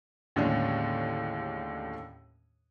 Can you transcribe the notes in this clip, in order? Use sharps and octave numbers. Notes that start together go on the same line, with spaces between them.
D#2 A2 D3 G#3 C#4 D4